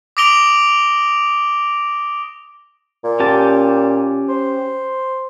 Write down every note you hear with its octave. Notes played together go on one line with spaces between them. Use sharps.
D6 D#6 A#6 D7 F7 G7
A#2
C#4 G4 A5
C5